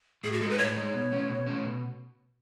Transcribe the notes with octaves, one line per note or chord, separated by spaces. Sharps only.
A2 G#4
F#4
G#3 A4
D#4 B4
A2 C#5
G#3 D#4
B2
A3 C#4
B2
A3 C#4
B2